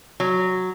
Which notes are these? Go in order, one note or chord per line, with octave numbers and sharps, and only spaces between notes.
F#3